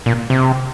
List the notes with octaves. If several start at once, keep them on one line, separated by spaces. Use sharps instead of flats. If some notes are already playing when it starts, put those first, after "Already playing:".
A#2
C3